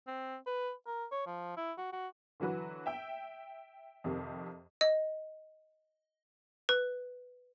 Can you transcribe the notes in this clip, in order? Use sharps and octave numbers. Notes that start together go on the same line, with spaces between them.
C4
B4
A#4
C#5
F3
E4
F#4
F#4
D3 E3 F#3 F#4 B4
E5 G5 E6
F2 C3 D#3 G4
D#5
B4